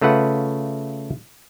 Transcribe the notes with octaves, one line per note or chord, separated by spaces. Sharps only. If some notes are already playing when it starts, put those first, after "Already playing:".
C#3 A3 F4 B4 F#5